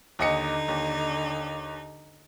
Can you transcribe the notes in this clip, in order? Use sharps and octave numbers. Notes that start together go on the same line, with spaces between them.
D#2 D3 D#4 D#5 C#7
D#2